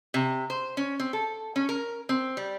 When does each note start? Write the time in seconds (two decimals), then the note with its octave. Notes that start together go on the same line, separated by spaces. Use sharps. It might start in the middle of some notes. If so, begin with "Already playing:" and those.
0.14 C3
0.50 C5
0.77 C#4
1.00 C4
1.13 A4
1.56 C#4
1.69 A#4
2.09 C4
2.37 G3